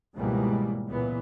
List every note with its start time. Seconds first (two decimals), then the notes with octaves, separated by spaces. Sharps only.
0.15 C#2 G#2 B2 E3 G3 A#3
0.86 C#2 A#2 E3 B3